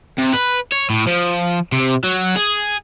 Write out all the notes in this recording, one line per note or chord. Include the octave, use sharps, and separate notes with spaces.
C3
B4
C#5
A2
F3
C3
F#3
G#4